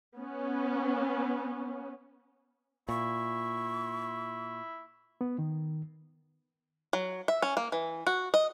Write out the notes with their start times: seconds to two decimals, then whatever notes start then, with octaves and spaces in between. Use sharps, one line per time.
0.17 B3 C#4
2.89 A#2 E4 C#6
5.21 B3
5.39 D#3
6.93 F#3
7.28 E5
7.42 C#4
7.57 A#3
7.72 E3
8.07 F#4
8.34 D#5